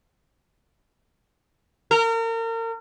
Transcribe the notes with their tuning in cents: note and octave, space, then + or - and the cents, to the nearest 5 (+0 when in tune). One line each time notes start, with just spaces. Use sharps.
A#4 -35